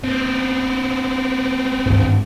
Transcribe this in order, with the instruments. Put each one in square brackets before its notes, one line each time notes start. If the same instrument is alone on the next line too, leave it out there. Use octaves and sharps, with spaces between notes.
[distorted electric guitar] B3 C4
[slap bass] G#1 G2